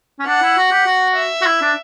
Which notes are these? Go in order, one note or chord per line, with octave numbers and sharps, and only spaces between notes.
C#4
D4 F#5
E4
F#4
G4
F#4
E5
F#4
E4
D4